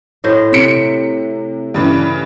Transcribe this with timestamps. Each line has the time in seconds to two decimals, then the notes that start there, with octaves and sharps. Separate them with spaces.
0.24 A2 C5 D#5
0.52 C3 B6 C#7
1.74 G2 C#3 E3